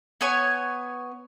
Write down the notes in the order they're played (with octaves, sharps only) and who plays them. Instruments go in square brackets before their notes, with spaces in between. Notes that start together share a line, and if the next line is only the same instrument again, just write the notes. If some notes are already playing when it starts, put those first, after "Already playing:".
[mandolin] B3 C#5 G#5 C#6